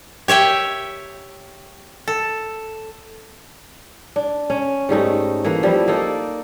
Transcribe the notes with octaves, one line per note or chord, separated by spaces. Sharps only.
G4 C#5 E5 G5
A4
D4
C#4
G#2 G3 A3 D#4
E3 A3 A#3
F3 G3 E4
A#3 D#4 A4 D5